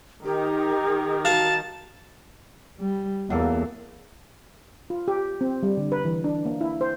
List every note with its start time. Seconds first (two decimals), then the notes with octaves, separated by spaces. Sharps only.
0.25 D#3 D#4 G4 A#4
1.25 F#4 F5 A5
2.80 G3
3.30 E2 F#3 A#3 A4
4.90 F4
5.08 G4
5.41 C4
5.63 G3
5.77 D3
5.92 B4
6.05 E3
6.24 D4
6.45 A#3
6.61 E4
6.81 C5